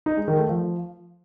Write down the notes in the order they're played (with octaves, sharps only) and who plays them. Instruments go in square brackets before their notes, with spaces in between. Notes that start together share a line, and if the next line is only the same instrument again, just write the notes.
[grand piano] D#4
G#3
D#3
A3
F3